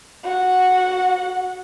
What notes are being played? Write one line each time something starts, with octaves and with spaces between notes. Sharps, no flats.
F#4 F#5